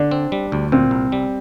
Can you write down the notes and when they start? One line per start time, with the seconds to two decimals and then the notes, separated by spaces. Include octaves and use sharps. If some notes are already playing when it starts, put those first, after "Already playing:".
Already playing: D3 D4
0.11 C4
0.32 G3
0.52 D2
0.72 A#2 C4
0.91 C2
1.12 G3